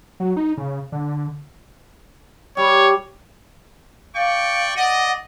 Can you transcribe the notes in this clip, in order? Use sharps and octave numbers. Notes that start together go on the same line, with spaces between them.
F#3
D#4
C#3
D3
G3 C#5
D5 F5 G5 C#6
D5 D#5 F#5